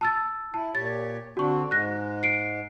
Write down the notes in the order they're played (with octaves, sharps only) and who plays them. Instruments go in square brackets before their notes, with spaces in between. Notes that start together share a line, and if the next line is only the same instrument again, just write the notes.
[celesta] A5 E6 A6
[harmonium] E4 [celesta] A5
[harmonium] A#2 G4 C#5 [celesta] A6
[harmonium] D3 C4 D4 [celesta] F#4 C#6
[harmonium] G#2 G#3 [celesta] F#6 A#6
[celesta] C7 D7